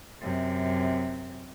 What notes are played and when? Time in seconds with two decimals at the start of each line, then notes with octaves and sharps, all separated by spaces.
0.22 F#2 C3